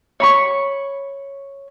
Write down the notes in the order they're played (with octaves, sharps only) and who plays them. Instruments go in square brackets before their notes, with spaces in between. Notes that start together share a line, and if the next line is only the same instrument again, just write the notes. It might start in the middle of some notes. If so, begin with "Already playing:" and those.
[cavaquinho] C#5 B5 C#6